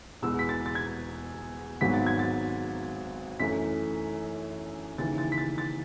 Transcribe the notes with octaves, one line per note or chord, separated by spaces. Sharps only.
E2 B2 G#3 B3 E6
B6
A6
A6
G#6
G#1 G#2 F#3 B3 B6
A6
G#6
A6
F#2 E3 A3 B6
D#2 C#3 E3 A6
A6
B6
A6
A6